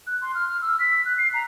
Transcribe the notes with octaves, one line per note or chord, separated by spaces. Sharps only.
F#6
C6
F6
F6
E6
B6
F#6
C7
A#5